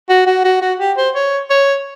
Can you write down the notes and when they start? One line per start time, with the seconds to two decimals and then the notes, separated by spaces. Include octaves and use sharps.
0.09 F#4
0.27 F#4
0.45 F#4
0.62 F#4
0.80 G4
0.97 C5
1.15 C#5
1.50 C#5